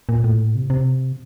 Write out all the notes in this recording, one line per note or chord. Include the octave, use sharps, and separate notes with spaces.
A#2
A2
C3
C3